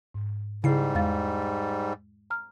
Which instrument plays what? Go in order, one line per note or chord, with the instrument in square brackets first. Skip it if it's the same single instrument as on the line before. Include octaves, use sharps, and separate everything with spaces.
[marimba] G#2
[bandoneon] G#2 G3 [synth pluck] C#3 C7 [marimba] E4 G#4
[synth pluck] E2 [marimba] G#3 F5 A6
[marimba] A#5 F6